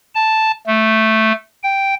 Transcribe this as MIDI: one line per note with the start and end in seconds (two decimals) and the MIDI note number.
0.15 0.52 81
0.67 1.32 57
1.63 1.94 79